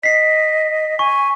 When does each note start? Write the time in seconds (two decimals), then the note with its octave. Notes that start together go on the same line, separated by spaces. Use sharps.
0.03 D#5 B6 C7
0.99 G#5 C#6